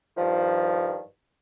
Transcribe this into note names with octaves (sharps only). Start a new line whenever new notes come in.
G2 D#3 F3